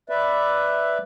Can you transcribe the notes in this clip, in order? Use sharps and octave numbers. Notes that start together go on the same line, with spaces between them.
B4 D5 E5